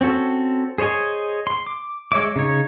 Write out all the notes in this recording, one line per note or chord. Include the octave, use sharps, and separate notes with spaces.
C4 C#4 F#4 A4
G#4 C5 C#5 D#5 G#5
C6
D6
G#3 C#5 E5 D6
C#3 D#4 C#5